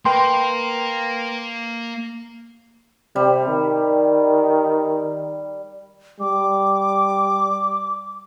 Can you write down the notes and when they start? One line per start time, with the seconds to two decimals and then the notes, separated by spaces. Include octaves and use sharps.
0.05 A#3 B4 G5 C6
3.16 C3 G3
3.48 D#3
6.20 G3 D6